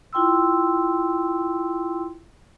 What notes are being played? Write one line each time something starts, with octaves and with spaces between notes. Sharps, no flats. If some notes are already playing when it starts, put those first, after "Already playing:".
E4 F4 G5 C6 E6